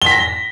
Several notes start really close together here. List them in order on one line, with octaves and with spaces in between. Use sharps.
G7 B6 A#6